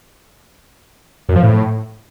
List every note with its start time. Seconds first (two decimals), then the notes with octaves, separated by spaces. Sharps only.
1.29 F#2
1.36 F3
1.43 A2